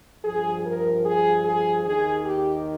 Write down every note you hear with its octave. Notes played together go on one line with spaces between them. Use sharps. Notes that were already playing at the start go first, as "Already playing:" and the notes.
G2 F3 G#4
A#4
G#4
G#4
D#2 D#3 G#4
G4